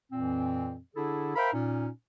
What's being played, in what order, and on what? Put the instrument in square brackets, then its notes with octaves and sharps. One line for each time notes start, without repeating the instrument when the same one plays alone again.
[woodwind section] F2 A#2 E3 C4
D3 D4 E4 G#4 A4
A#4 C5 E5 F5 G5 B5
A#2 C#4 D#4